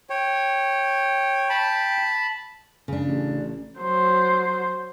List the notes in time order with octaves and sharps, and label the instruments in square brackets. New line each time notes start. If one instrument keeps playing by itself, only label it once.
[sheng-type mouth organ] C#5 [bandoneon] G5
[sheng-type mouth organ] A5 B5
[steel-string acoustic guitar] C#3 D4
[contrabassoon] A1
[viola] F#3 C5